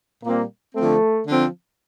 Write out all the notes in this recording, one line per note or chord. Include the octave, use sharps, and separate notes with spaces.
A#2 G3 A#3 C4
D3 F3 A3 C4
D3 F3 C4